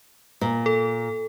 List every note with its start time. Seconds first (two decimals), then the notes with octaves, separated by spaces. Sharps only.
0.41 A#2
0.66 A4